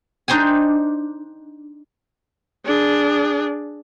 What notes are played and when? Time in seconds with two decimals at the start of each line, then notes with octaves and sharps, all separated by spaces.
0.28 D4 D#4 C5 G5 G#5
2.65 D4 G#4